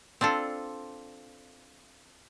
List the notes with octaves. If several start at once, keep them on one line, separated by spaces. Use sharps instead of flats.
C4 D4 F4 A4